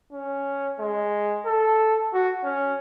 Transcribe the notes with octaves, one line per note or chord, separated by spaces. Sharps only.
C#4
G#3
A4
F#4
C#4